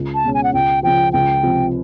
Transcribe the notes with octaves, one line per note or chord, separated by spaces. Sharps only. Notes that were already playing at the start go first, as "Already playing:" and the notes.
Already playing: C#2
A5
B2 G#3 C#4
G#5
F#5
C#2 G5
C#3 F3 G5
C#2 G5
C3 F3